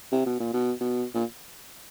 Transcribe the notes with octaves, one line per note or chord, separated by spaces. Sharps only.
C3
B2
A#2
B2
B2
A#2